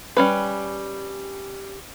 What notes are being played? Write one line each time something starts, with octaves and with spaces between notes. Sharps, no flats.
G3 C#4 B4